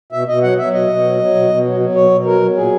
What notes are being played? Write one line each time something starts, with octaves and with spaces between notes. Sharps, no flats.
B2 E5
B2 D#5
F#3 F#5
F#3 E5
B2 D#5
B2
F#3
F#3
B2
B2
F#3
F#3
B2 C#5
B2
F#3 A#4
F#3
A#2 G#4